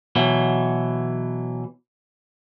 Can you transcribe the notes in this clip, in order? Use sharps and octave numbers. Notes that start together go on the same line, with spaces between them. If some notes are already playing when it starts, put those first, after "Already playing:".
B2 E3 F#3